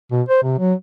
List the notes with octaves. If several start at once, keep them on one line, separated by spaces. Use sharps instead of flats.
B2
C5
C3
F#3